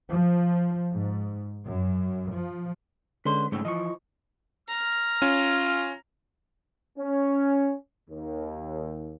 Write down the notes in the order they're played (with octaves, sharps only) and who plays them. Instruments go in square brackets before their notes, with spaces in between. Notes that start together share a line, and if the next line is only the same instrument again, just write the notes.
[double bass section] F3
G#2
F#2
F3
[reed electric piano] D3 G#3 C#4 [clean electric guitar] B4 C6
[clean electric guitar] B1 C#3 A3 [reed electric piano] G#2
[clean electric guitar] E3 F3 [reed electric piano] D#5 C#6
[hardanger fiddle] A#5 [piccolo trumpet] F6
[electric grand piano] C#4 [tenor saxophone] F4
[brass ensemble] C#4
D#2